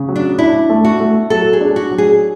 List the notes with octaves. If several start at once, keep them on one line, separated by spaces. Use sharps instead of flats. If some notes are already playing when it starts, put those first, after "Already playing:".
Already playing: C#3
F#3
D4
D4 E4
A3
F#4
A3
F#3 A4
G#4
D4
F#4
F#3
G#4